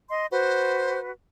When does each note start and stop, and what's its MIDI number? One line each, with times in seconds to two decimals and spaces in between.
0.10 0.26 75
0.10 0.26 84
0.32 1.10 66
0.32 1.10 71
0.32 0.99 72